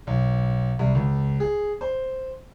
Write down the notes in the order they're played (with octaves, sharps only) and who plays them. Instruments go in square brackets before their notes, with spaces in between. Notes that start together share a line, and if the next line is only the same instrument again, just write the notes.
[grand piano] B1
C2
C#2
G#4
C5